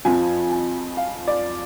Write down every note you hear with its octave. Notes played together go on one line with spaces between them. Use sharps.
F2 F3 G#5
G#5
F5
D5